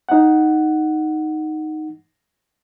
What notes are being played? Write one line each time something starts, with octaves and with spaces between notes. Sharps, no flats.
D#4 F#5